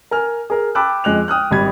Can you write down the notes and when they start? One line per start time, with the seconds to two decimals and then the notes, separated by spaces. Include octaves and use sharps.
0.11 A#4 G#5 F6
0.50 G#4 A#4
0.75 G5 A5 B5 D6 E6 F#6
1.04 F2 G#3 F#6 F7
1.28 G5 D#6 F6 F#6
1.51 G#1 G3 B5 G#6